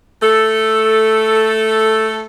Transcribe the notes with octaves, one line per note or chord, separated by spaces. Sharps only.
A3 A4